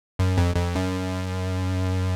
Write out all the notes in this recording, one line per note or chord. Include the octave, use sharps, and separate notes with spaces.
F#2
F2
F2
F#2